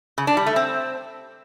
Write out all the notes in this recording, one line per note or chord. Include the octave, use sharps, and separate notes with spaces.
C#3
D4
G3
A3
C4